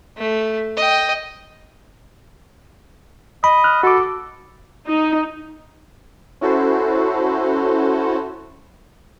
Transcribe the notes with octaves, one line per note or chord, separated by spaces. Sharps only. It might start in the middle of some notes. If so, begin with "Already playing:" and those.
A3
D#5 G5
D#5 B5
F6 F#6
F#4 A4 D6
D#4
C#4 E4 F#4 A4 C5